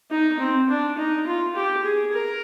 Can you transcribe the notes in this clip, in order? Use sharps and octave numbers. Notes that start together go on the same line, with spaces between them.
D#4
C4
D4
D#4
F4
G4
G#4
A#4